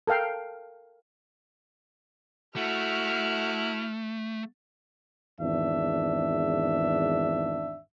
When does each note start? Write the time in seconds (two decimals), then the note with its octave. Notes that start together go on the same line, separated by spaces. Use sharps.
0.07 A4 A#4 F5 G5
2.56 A3 E4 F#4 F6
5.39 G#1 E2 D4 E5